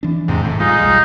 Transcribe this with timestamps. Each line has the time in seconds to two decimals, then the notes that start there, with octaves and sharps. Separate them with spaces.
0.03 E3 D4
0.28 E2 G#2 C3 E3
0.44 D#1 A2
0.60 D#2 G3 G#3 D#4 F4
0.85 B1